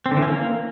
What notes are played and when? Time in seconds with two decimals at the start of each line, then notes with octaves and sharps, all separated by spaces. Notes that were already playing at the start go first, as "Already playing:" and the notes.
0.06 C4
0.11 D3
0.17 E3
0.22 C#4
0.28 A#3